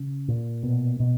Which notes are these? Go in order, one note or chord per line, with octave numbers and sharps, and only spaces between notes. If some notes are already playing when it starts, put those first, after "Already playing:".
Already playing: C#3
A#2
B2
B2